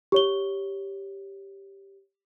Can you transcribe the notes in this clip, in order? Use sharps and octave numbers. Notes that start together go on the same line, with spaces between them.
G4 C#5 G7